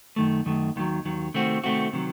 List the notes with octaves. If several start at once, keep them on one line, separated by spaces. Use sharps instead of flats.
F#2 D#3 A3
F#2 D#3 A3
D#2 D#3 F#3
D#2 D#3 F#3
C3 D#3 A3 C4 F#4
C3 D#3 A3 C4 F#4
C3 D#3 F#3